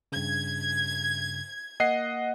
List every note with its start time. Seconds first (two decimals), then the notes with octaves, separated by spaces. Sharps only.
0.12 G2 C#3 G#6
1.80 A#3 D#5 F#5 C7